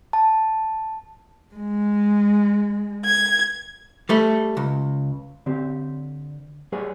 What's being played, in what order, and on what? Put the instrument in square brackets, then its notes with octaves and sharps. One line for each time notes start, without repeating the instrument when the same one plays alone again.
[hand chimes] A5
[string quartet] G#3
G#6
[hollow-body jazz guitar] G3 A3
C#2
D3 C4 G4
G3 G#4 B4 C#5 G#5